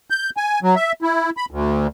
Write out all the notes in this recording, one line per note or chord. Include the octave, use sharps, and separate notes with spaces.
G6
G#5
F#3
E5
E4
B5
D2